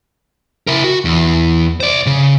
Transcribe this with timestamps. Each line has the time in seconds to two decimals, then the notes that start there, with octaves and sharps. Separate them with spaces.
0.67 E4 A#4
0.84 F#4
1.05 E2
1.80 C5 D5
2.06 C#3